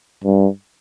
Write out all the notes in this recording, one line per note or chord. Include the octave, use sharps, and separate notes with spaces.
G2